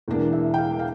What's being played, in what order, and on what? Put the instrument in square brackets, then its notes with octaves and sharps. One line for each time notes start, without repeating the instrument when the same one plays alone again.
[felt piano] E1 E2 E3 A#3 D4
E5
G5
F5
F5